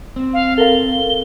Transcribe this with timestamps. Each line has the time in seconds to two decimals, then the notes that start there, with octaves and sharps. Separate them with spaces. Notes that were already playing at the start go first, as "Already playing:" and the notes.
0.16 C4
0.34 F5
0.58 A4 A#4 F5 G7